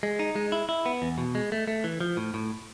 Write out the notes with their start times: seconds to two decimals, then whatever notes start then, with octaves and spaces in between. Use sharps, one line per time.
0.03 G#3
0.19 D#4
0.36 G#3
0.52 E4
0.69 E4
0.86 B3
1.02 E2
1.18 B2
1.35 G#3
1.52 A3
1.68 A3
1.84 E3
2.01 F3
2.17 A2
2.34 A2